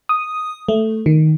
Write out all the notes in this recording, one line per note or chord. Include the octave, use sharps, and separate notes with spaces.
D#6
A3
D#3